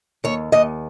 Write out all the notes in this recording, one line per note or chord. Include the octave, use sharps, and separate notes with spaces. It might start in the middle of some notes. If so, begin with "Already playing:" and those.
D#2 C#5
D#2 D#5